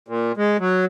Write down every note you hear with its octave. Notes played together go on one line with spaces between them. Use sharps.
A#2
G#3
F#3